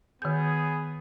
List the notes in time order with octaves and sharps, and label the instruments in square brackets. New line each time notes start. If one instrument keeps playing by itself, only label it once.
[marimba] D#3 G6 [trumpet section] B3 G#4